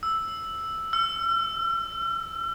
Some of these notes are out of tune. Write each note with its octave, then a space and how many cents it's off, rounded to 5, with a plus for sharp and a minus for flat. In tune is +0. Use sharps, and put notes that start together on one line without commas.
E6 +0
E6 +45